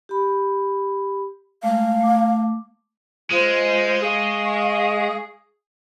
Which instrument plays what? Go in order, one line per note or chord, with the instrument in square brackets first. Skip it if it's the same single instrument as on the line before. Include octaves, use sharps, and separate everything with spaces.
[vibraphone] G4 B5
[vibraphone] G#3 A3 [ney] F5
[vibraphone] A3 D6
[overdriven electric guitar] G#3 [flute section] F4 C5
[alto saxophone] G#4 [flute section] F5 C#6 D#6